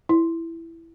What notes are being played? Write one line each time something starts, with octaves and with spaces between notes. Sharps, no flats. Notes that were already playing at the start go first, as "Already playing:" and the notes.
E4